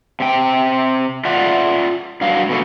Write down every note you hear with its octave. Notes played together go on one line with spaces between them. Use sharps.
C3 G5
F4 D5 E5 F#5
G2 F#3 F5
B2 D3 A3